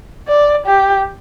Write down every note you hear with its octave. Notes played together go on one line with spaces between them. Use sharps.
D5
G4